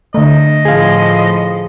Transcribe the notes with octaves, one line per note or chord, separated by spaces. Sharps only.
D3 A3 D#5
A2 F3 G#4 F5